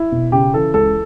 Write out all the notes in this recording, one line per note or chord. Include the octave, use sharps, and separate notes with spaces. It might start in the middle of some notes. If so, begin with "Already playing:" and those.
Already playing: E4
B2
C#3 G4
E3 A4
C#2 A4